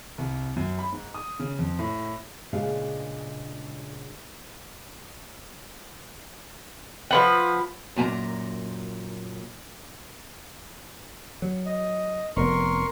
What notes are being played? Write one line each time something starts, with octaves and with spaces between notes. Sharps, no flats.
C2
F#2
B5
G#2
D#6
C#3
F2
A2
A#2 C#3 G#3 D4 G#4 F5
F3 B4 F#5
F#2 A#2 G#5 A#5
F#3
D#5
F1 F3 B3 A#4 C6 C#6